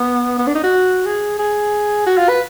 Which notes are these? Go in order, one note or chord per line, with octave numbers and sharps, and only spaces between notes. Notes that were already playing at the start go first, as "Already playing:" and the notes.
Already playing: B3
B3
D4
D#4
F#4
G#4
G#4
F#4
F4
B4